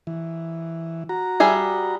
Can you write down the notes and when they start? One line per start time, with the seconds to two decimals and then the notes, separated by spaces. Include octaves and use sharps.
0.07 E3
1.09 F#4 A#5
1.40 G3 G#4 E5